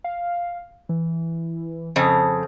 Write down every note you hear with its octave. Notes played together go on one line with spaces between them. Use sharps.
F5
E3
F2 C#3 C5